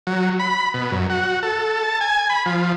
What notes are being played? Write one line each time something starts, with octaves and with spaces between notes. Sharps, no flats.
F#3
B5
B2
F#2
F#4
A4
A5
G#5
B5
F3